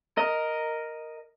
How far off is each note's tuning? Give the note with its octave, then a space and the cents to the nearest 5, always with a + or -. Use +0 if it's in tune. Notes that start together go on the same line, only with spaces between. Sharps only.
A#4 +0 D#5 +0